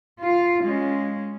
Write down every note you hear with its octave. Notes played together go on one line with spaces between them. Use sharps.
F4 F5
G#3 C#4